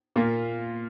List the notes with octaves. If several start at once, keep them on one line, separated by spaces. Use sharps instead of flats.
A#2 A#3 F4